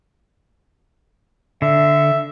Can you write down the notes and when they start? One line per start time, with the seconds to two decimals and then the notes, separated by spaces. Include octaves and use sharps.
1.62 D3 E5